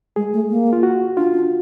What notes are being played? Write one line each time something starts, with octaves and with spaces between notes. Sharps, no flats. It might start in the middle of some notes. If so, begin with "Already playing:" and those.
G#3 G#4
A3
A#3
F4
F#4
D4 F4
D4